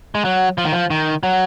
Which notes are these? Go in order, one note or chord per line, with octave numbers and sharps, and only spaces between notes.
G#3
F#3
F3
D#3
F3
D#3
F#3